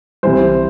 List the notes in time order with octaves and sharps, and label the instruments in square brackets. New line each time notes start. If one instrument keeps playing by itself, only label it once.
[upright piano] C2 C3 E3 G3 C5